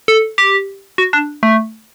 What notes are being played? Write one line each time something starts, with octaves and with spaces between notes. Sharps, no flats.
A4
G4
F#4
D4
A3